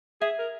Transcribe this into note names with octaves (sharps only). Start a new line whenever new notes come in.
G#4 E5
A#4